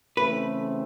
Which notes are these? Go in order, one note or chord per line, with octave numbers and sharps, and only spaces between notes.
C#3 E3 A3 C4 B4